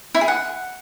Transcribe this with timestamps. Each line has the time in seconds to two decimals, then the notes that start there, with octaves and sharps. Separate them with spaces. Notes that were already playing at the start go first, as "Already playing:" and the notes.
0.14 E4
0.21 G#4
0.28 F#5